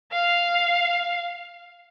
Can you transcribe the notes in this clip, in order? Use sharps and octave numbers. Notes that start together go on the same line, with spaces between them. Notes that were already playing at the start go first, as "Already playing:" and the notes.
F5